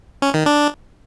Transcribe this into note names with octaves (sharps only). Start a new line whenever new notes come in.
C#4
D#3
D4